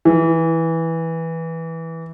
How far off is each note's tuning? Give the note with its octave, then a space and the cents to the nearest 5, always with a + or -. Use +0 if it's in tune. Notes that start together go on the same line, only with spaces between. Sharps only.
E3 -10